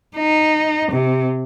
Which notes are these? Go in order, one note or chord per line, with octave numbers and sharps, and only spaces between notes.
D#4
C3